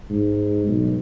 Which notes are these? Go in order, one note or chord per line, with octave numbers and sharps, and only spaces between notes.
G#2
B1